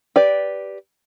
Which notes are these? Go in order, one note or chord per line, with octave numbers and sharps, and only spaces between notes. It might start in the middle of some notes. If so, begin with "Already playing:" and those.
G4 B4 D5